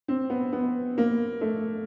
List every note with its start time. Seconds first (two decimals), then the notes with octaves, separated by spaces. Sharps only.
0.08 C4
0.30 B3
0.53 B3
0.98 A#3
1.41 A3